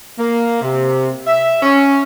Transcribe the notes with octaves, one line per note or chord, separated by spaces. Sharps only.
A#3
C3
E5
C#4